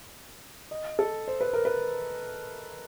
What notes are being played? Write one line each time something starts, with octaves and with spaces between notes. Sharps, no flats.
D#5
A4
C5
B4
A#4
B4